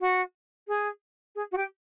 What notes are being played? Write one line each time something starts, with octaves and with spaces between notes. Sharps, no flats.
F#4
G#4
G#4
F#4
G4